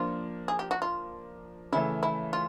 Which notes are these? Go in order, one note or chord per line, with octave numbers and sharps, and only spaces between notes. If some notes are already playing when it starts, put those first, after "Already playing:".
Already playing: F3 A#3 D4 F4
G#4
G4
F#4
F4
C#3 E3 A3 E4
E4
F4